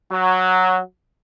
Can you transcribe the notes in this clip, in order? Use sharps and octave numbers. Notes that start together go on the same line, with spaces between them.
F#3